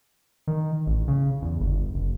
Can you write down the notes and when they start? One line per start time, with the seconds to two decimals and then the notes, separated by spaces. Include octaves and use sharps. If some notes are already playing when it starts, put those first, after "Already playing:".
0.47 D#3
0.87 A1
1.08 C#3
1.42 E2
1.60 G1
1.94 F#1